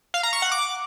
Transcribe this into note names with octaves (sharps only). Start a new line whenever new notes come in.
F5
A#5
C#6
F#5
D6